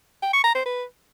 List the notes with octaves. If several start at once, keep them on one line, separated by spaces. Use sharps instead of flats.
G5
C#6
A#5
C5
B4